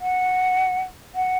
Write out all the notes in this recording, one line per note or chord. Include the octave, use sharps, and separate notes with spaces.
F#5
F#5